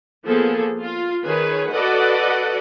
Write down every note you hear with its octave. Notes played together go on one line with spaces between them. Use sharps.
F3 A#3 B3 G#4 A4
F4
D#3 G#4 B4 C#5
F#4 A4 B4 D5 D#5 F#5